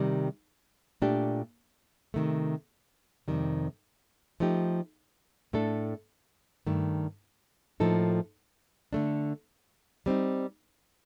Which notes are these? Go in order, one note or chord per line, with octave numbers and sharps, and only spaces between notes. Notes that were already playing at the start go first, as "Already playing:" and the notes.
Already playing: C3 D#3 G3
A#2 A3 D4 G4
C3 D#3 A3
F2 C3 D#3 G3
F3 A3 D#4 G4
A2 A3 D4 A4
G2 D#3 A3
A2 F3 A#3 D#4 A4
D3 A3 D4
G3 C4 D#4